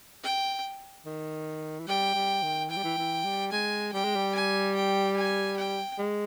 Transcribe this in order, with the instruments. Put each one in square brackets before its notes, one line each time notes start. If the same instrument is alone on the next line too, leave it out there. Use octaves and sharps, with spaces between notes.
[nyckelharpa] G5
[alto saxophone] D#3
E3
[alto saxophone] G3 [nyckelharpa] G5
[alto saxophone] G3
D#3
[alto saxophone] E3 [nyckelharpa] G5
[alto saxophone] G3
E3
E3
G3
[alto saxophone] G#3 [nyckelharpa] G#5
[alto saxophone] G3 [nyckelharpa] G5
[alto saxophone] G#3
G3
[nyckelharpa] G#5
G5
G#5
G5
[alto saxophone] G#3